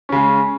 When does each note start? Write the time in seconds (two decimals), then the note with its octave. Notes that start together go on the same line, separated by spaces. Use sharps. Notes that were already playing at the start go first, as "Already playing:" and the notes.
0.09 C#4
0.12 C#3
0.16 G#3